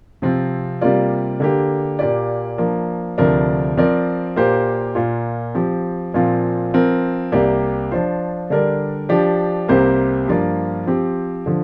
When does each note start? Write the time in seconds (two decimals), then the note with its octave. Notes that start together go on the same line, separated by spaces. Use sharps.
0.22 C3 F3 C4 F4
0.81 C3 G3 A#3 F4 D5
1.40 D3 A#3 G4
1.99 A#2 A#3 G4 D5
2.58 F3 A#3 D4
3.18 D2 C3 F3 D4 A#4
3.77 F3 C4 A#4 D5
4.36 A#2 A#3 G4 C5
4.95 A#2 A#3 F4
5.54 F3 C4 G4
6.14 A#2 F3 C4 F4
6.73 F3 C4 A#4
7.32 C2 C3 A#3 G4 D5
7.92 F3 D4 F4 C5
8.50 D3 G3 D4 A#4 D5
9.09 F3 D4 G4
9.68 C2 C3 A#3 G4 C5
10.27 G2 F3 A#3 F4 D5
10.87 F3 C4 G4
11.46 D3 F3